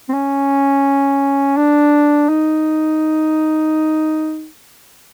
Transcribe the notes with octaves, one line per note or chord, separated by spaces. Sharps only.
C4
C#4
D4
D#4